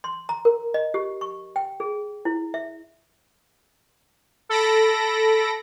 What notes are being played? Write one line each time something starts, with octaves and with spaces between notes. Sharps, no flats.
C6
A#5
A#4
D#5
G4
C#6
G5
G#4
E4
E5
A4 B5 A#6 D7